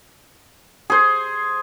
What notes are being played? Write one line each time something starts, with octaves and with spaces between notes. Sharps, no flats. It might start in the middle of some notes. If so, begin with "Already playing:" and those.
G#4 C5